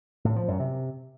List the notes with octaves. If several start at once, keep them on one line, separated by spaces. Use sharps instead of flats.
A2
F3
F#2
C3